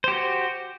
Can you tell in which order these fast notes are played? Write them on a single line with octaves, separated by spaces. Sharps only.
C5 G4 F#4